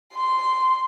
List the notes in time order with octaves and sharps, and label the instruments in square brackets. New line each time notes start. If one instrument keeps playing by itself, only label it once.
[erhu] C6